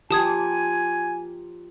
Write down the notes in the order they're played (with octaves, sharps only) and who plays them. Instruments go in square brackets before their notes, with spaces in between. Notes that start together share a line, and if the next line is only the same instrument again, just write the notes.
[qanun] F3 A#3 [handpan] G4 [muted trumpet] G#5 [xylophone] A5 D#6 G#6